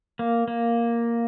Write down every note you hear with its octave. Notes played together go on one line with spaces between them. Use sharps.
A#3
A#3